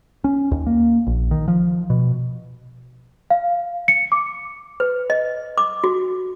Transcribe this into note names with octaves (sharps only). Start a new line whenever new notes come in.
C#4
D#2
A#3
A#1
D#3
F3
B2
F5
C#7
D6
B4
D#5
D6
F#4